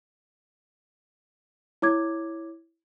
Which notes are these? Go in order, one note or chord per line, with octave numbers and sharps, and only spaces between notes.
E4 C#5 D6 G#6